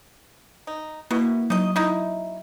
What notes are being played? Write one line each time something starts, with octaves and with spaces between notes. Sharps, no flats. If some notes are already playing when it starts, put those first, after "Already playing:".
D#4
B2 A#3 E4
F#3 D#4 D#5
D#4 E4